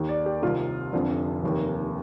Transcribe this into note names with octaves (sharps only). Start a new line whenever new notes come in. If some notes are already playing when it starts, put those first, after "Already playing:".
Already playing: D#2 D#3
D5
G4
C2 C3 D#3 F4
F1 F2 D3 F3
F1 D#2 D#3